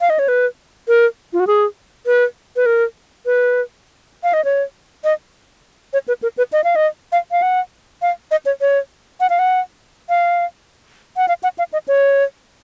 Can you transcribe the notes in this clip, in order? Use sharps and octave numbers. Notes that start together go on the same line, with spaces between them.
F5
D#5
C#5
B4
A#4
F4
F#4
G#4
B4
B4
A#4
B4
F5
D#5
C#5
D#5
C#5
B4
A#4
B4
D#5
F5
D#5
F5
F5
F#5
F5
D#5
C#5
C#5
F#5
F5
F#5
F5
F#5
F5
F#5
F5
D#5
C#5